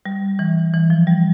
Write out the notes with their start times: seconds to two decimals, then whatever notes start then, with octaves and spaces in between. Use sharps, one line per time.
0.06 G3
0.39 E3
0.74 E3
0.90 F3
1.07 G3